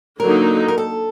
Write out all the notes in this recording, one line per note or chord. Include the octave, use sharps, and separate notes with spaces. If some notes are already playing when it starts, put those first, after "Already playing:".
D3 F#3 A#3 D#4 A#4
A#4
A4